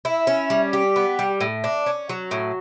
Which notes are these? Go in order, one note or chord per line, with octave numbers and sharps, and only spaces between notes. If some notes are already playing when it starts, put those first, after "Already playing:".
E4
C#4
G3
G4
B3
G3
A2
D4
C#4
F#3
A2